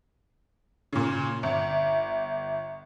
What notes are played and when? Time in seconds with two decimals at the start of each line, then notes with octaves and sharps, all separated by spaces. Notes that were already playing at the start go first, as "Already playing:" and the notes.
0.93 A#2 C#3
1.43 G1 E5